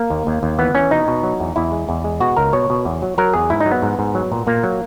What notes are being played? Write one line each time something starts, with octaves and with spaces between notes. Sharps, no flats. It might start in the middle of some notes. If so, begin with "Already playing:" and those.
Already playing: A#3
D#2
D#2
D#2
E3 B3
E3 C#4
B2 D#4
B2
F#3
E2
E2 E4
G#3
E2
G#3
B2 F#4
C#2 A#4
B2 C#5
B2
E2
F#3
F#3 A#4
E2 G#4
G#2 E4
D#4
F#3
B3
G#2
G#2
F#3
A#2
A#2 A#3
F#3